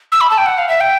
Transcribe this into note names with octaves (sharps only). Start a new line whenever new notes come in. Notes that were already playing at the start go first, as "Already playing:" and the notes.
E6
B5
A5
G5
F#5
F5
E5
G5